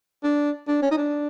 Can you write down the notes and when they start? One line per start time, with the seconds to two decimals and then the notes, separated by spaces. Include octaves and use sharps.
0.24 D4
0.68 D4
0.82 C#4
0.91 D#4
0.97 D4